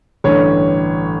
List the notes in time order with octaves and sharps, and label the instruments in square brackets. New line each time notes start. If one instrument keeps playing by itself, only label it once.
[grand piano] A1 G2 D3 C#5